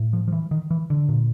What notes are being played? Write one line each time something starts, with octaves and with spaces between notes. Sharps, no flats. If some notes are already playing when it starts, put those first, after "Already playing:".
Already playing: A2
F3
F3
E3
D#3
E3
D3
A#2